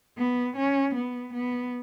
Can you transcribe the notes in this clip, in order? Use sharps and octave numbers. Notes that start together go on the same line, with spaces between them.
B3
C#4
B3
B3